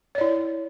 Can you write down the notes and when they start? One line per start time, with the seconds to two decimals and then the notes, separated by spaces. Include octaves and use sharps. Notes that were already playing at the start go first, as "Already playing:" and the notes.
0.15 C#5
0.18 D5
0.21 E4